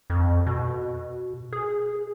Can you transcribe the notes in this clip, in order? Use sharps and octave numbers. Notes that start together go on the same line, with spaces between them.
F2
B2
G#4